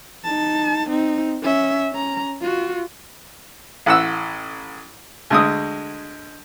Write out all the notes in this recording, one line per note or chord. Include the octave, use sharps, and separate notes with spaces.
D#4 A5
C4 D#4
C#4 E5
C#4 A#5
F4 F#4
A1 F#5 E6
D2 G#3 D#6